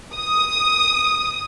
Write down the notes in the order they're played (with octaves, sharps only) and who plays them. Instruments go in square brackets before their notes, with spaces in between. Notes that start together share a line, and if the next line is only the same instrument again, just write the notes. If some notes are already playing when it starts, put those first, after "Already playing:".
[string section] D#6